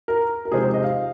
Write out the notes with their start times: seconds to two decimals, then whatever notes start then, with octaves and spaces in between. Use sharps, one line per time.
0.08 A#4
0.45 A#4
0.52 C3 F3 G#3 C4 D#4 G#4
0.63 C5
0.74 D#5
0.84 F5